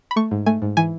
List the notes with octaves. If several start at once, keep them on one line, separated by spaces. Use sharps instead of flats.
B5
A3 C#6
G#2
A3 G#5
G#2
E3 G#5